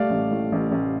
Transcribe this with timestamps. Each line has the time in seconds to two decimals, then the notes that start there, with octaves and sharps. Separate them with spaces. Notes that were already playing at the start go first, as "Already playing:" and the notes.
Already playing: G3 A3 D5 F5
0.10 A1
0.31 A2
0.52 A1
0.71 A1